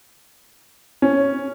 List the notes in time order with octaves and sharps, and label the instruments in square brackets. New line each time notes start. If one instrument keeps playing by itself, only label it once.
[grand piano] C#4